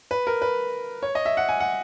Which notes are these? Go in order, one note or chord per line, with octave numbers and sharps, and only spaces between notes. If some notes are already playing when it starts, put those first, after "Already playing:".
B4
A#4
B4
C#5
D#5
E5
F#5
G#5
F#5